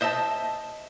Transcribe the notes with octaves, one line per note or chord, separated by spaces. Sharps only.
C5 D#5 E5 A5